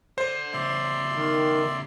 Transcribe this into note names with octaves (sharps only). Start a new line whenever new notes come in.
A4 C5 D5
A2 C#3 D5 E5 C6
D#3